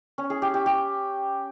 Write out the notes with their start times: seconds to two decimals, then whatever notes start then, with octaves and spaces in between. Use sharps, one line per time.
0.18 C#4
0.30 G#4
0.42 G4
0.54 G4
0.66 G4